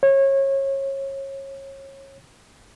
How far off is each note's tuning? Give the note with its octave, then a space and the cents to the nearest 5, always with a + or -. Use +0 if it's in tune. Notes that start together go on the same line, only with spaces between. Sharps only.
C#5 -25